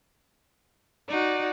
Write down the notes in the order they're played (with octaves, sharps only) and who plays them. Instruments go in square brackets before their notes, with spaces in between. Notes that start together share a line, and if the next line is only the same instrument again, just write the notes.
[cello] D#4 [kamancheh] F#4 D5